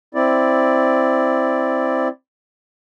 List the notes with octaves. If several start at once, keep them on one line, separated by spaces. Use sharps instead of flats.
C4 E4 D5